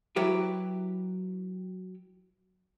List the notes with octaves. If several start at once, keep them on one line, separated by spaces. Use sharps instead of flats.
F#3 E4 G4 B4